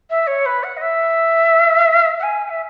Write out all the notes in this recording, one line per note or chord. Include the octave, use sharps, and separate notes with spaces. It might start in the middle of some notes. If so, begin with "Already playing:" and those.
E5
C#5
B4
F#5
D#5
E5
F#5
G#5
E5